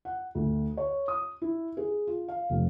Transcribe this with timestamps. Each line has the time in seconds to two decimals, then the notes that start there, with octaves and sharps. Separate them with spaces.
0.05 F#5
0.35 D2
0.77 C#5
1.08 D#6
1.42 E4
1.77 G#4
2.07 F4
2.28 F5
2.50 F1